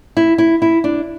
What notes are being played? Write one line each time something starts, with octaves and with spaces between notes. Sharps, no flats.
E4
E4
E4
D4